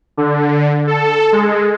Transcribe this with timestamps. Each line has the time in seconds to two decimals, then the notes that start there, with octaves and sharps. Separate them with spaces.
0.17 D3
0.87 A4
1.32 G#3